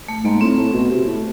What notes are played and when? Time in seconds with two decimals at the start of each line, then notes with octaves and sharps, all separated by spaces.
0.08 A3
0.24 G#2 A#3
0.41 A2 C4
0.57 A2
0.73 B2
0.90 C3
1.06 A2